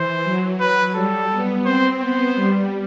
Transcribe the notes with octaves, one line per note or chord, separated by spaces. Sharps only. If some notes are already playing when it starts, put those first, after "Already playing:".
Already playing: E3 C5
F#3
B4
G3 A4
B3
C4 C5
B3 C5
G3